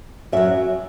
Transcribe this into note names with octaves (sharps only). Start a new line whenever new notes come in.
F#2 F#3 E5